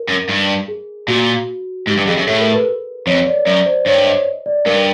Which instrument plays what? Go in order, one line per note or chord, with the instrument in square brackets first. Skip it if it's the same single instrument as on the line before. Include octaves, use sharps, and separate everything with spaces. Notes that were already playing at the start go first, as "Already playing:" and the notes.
Already playing: [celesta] A#4
[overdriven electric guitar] F#2
G2
[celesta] G#4
[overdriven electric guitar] A#2 [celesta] F#4
[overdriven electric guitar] G#2 [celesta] G4
[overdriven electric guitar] G2
[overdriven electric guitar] F2 [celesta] G#4
[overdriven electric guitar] F#2
[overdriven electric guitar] A2 [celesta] A4
[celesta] A#4
B4
[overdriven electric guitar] F2 [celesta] C#5
[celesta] D5
[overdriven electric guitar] F#2 [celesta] D5
[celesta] C5
[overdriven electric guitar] G2 [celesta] C#5
[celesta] D#5
D5
[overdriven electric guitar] G2 [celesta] A#4